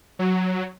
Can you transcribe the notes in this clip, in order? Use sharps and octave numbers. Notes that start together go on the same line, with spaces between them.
F#3